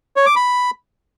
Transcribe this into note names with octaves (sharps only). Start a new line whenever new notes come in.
C#5
D6
B5